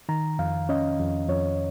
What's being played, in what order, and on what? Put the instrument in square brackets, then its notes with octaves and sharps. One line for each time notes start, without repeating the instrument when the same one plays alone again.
[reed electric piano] D#3 A#5
F2 F5
C#4 D#5
F2
F2 C#5